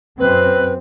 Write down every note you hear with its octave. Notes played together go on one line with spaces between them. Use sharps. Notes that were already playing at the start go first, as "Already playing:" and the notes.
F#2 C4 B4